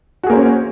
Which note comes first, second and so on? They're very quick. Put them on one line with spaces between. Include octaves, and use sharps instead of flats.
F#4 G#4 A#3 C5 C#4